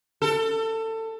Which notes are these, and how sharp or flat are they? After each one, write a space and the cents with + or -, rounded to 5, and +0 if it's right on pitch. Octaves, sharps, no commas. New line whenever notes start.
A4 +25